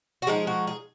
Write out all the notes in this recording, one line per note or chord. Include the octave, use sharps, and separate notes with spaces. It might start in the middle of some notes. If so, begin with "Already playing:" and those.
F#4
F3 G#3 D#4 G#4
F#4
G#4